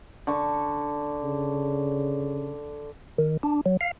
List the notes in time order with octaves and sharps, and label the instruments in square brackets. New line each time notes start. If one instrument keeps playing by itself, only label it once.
[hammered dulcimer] D3 C#6
[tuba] C#3
[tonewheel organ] D#3
D4
F#3
F5